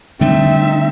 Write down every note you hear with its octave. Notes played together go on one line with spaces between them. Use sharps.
D3 G3 A3 C4 D#4 E5